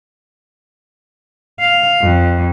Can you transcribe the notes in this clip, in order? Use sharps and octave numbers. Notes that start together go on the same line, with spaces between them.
F5
F2